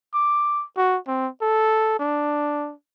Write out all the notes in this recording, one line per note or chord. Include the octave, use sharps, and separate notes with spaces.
D6
F#4
C4
A4
D4